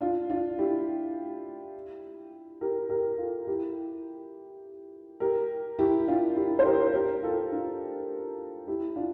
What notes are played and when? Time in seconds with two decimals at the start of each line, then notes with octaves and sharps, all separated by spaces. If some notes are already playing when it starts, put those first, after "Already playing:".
0.01 D4 F4
0.30 D4 F4
0.58 E4 G4
2.61 G4 A#4
2.89 G4 A#4
3.18 F4 A4
3.47 E4 G4
5.20 G4 A#4
5.79 E4 G4
6.07 D4 F4
6.36 E4 G4
6.59 C5
6.65 G4 A#4
6.94 G4 A#4
7.23 F4 A4
7.51 D4 F4
8.67 E4 G4
8.96 D4 F4